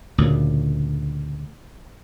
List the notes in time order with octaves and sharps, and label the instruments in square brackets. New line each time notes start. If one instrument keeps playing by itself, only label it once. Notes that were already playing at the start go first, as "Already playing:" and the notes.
[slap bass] D2 A#2 C#3